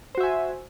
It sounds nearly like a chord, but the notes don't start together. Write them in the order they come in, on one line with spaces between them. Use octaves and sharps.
C5 F#4 E5 G#5